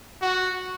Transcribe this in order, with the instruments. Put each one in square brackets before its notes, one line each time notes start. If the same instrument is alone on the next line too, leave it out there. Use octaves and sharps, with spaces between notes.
[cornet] F#4